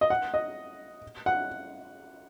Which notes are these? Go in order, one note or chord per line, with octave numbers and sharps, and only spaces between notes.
D#5
F#5
D#5
F#5